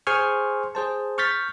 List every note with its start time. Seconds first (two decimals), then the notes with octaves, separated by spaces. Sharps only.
0.07 G#4 C5 G#5 C6 C#6 F6
0.75 G#4 C5 A5
1.18 C#6 F6 G6 A6 B6